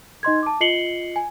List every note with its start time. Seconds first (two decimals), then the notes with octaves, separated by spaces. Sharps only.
0.23 D#4 D#5 C6 G#6
0.43 A5 D6
0.61 F4 D#5 C7 C#7 F#7 G7
1.16 G#5